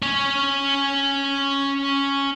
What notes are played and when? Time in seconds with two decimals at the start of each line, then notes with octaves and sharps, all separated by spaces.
0.02 C#4 C#5